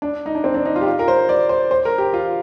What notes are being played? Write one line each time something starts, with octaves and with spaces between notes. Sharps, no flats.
D4
D#4
D4
C4
D4
D#4
F4
G4
F4
A#4
C5
D5
C5
C5
A#4
G4
F4